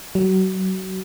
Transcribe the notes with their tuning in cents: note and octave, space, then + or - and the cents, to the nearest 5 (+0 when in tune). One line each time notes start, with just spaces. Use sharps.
F#3 +30